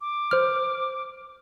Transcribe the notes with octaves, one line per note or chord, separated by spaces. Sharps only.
D6
C5 F6